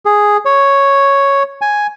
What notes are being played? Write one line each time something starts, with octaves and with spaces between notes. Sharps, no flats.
G#4
C#5
G#5